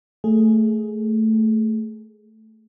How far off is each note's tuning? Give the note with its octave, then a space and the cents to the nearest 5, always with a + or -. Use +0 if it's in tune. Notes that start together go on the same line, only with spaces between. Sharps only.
A3 +5 G#4 +10